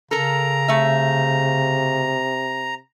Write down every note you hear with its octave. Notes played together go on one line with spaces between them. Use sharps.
C#3 A4 A#4 A#5
C3 A3 E5